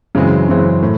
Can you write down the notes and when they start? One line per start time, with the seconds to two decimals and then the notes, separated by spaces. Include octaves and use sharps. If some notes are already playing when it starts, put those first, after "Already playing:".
0.15 F#2 C#3 E3 G#3 C4
0.48 F#2 C#3 E3 G#3 C4
0.82 A2